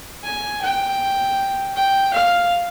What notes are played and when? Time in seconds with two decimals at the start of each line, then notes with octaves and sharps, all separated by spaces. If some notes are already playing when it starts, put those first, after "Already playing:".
0.24 G#5
0.62 G5
1.76 G5
2.13 F5